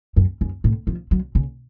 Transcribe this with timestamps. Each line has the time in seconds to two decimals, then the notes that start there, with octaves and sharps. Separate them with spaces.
0.16 F#2
0.41 F#2
0.64 A2
0.87 F3
1.11 F#3
1.35 C#3